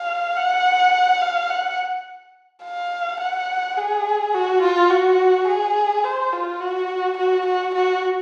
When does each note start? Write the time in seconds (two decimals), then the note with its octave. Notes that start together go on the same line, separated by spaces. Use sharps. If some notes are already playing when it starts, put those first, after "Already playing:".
Already playing: F5
0.36 F#5
1.21 F5
1.49 F#5
2.63 F5
3.20 F#5
3.77 G#4
4.34 F#4
4.62 F4
4.90 F#4
5.47 G#4
6.04 C5
6.32 F4
6.60 F#4
7.17 F#4
7.46 F#4
7.74 F#4